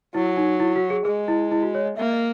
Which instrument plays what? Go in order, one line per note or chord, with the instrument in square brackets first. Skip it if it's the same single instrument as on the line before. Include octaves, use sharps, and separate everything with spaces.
[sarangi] F#3 [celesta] E4
[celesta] D#4
E4
F#4
G#4
[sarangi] G#3 [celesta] G#4
[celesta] E4
E4
F#4
C#5
D#5
[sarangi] A#3 [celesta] E5
[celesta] D#5